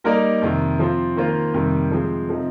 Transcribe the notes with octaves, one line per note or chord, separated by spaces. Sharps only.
G3 A#3 D#4 A#4 D5
F2 C3 D#3
F3 C4 F4
D#3 A#3 F4 C5
F2 C3 D#3 G3
F3 G#3 C4
C3 F3 C4 D#4